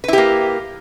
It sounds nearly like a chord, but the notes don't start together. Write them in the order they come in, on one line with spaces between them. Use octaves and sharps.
B4 E4 G4 A#3